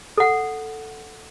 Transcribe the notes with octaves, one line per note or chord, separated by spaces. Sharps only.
A4 F#5